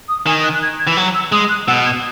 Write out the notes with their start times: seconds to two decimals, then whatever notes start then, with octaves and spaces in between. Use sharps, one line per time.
0.09 D#6
0.26 D#3 G#5
0.43 F#6
0.54 F#6
0.62 G#6
0.79 G#6
0.87 E3
0.97 F#3
1.14 E6
1.32 G#3 D#6
1.49 F#6
1.67 B2 E6
1.85 G#6